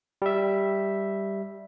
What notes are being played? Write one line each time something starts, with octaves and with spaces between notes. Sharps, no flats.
G3 E5